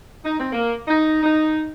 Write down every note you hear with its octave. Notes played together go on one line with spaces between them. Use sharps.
D#4
C4
A#3
D#4
D#4